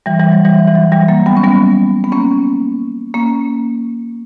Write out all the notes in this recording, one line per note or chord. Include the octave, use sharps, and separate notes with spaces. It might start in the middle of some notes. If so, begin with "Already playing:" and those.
E3 G3
E3 G3
F#3
E3 G3
E3
F#3
E3 G3
F#3 A#3
G3 B3
C#4
G3 B3
B3
A#3 C#4
A#3 C#4